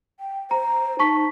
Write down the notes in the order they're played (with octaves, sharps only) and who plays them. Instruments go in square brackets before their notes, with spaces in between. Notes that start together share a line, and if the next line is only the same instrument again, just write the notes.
[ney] G5
[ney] C5 [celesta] A#5
[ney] D#4 [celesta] A5 C#6 B6